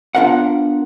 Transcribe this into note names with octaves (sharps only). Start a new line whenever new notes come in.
B3 D4 F4 A#4 F5 F#5